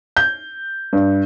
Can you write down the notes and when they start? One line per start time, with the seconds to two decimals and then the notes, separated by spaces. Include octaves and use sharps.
0.17 G6
0.93 G2